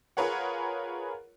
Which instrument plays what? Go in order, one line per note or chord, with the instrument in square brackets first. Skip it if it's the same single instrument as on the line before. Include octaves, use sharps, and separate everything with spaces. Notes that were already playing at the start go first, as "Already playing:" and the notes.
[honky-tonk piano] F4 G#4 A#4 B4 C#5 F#5